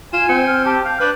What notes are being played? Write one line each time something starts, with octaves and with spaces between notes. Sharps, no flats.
F4 G#5 E7
C4 C#7
F6
G4 A5
F5 G6
D4 B4